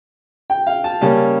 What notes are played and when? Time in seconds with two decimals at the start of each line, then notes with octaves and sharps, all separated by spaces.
0.50 G5
0.67 F5
0.84 A5
1.01 C#3 G3 A#3 C#4 A5